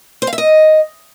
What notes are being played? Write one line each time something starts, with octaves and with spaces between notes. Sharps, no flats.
C5
F5
E5
D#5